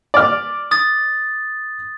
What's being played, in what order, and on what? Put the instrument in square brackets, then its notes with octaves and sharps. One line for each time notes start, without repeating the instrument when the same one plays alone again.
[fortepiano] D5 F6
[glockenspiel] D#6 A6